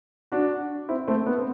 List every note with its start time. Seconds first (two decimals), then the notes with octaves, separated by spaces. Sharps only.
0.32 D4 F#4
0.89 C4 E4
1.08 A3 C4
1.26 B3
1.38 C4